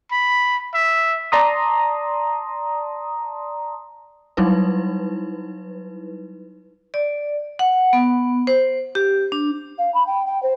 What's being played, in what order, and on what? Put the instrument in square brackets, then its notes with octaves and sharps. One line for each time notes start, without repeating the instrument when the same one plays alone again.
[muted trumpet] B5
E5
[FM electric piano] D5 A5 A#5 C6 D#6
[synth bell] F#3 G3 D#4 E4 B4
[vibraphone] D5
F#5
B3
C5
G4
D4
[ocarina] F5
B5
G5
G5
C5